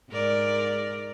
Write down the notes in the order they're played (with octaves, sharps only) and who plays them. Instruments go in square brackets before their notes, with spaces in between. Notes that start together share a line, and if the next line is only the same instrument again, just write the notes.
[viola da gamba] G#2 A#4 D5